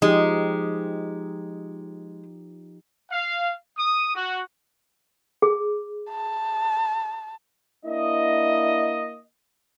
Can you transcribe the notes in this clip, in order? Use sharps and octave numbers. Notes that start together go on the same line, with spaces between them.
F3 G#3 D#4 G4
F5
D#6
F#4
G#4
A5
A#3 D4 E4 D#5